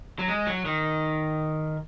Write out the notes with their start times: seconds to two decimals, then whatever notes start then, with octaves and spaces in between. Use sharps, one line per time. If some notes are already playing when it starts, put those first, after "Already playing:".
0.19 F#3
0.28 G#3
0.47 F#3
0.65 D#3